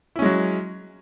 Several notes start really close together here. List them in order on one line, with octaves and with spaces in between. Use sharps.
E4 C#4 G#3 F#3